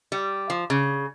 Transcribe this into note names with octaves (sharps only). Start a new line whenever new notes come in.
G3
F3
C#3